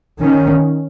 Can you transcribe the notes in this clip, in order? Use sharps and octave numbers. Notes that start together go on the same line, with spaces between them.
D#3 C#4